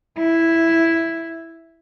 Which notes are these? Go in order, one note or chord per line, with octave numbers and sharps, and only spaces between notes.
E4